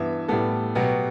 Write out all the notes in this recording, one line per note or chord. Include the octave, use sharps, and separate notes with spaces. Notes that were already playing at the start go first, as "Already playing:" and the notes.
Already playing: G2 E3 B3 E5
A2 G3 B3 A4
B2 F#3 B3 G4